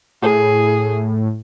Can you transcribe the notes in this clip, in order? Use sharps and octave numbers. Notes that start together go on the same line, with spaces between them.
A2 G#4